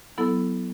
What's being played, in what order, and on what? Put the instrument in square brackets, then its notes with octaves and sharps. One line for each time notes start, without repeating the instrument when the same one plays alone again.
[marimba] F#3 B3 E4 A4